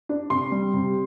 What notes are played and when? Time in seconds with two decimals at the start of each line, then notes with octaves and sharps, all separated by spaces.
0.09 D4
0.30 C3 C6
0.52 G3
0.74 C3